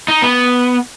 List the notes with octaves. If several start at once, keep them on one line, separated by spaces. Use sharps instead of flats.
D#4
B3